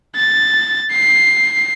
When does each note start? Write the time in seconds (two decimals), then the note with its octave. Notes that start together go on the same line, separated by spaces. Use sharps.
0.16 A6
0.92 C7